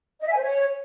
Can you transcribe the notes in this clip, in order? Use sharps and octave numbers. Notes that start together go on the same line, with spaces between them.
D#5
E5
G#5
C5
C#5